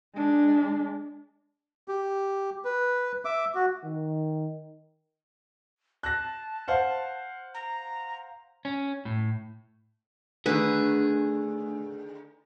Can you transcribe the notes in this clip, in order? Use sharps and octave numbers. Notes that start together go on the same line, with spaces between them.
G#3 D4
G4
B4
E5 D6
F#4
D#3
A5 F#6 A#6
C5 F5 F#5
A#5
C#4
A2
D3 D#3 A3 D4 G#4 B4